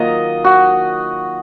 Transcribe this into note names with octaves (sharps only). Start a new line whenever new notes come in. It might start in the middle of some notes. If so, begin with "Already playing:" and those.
Already playing: D#3 F#3 A#3 F4 D#5
F#4